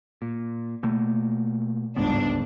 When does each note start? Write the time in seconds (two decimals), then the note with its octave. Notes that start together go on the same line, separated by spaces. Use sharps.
0.22 A#2
0.83 B2 A3 A#3
1.96 D1 G1 C#2 G#2 B3 D4